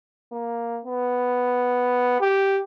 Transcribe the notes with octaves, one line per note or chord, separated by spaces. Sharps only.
A#3
B3
G4